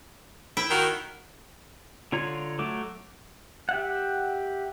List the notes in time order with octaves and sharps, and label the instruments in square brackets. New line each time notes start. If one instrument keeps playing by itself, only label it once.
[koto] E4 G5
[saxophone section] D#3 F#4 A#4
[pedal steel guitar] D3 F4 C#5 A#5
F#3 A3 D6
G4 E5 F#5